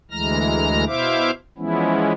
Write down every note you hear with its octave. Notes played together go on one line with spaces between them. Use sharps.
D2 E3 G#3 A#5 F6 A#6
B2 E4 C5 E5 F5 D6
E3 F3 G#3 B3 C#4 E4